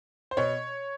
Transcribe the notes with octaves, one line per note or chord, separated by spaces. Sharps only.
C5
B2 C#5